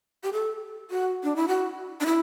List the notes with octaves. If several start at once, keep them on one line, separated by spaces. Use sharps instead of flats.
G4
A4
F#4
D4
E4
F#4
D4
E4